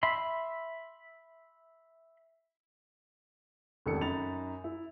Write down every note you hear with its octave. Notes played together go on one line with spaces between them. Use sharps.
E5 B5 C6
F1 C#2 D#3 A4 C#7
F#2 D#4 B5 A6 F7
E4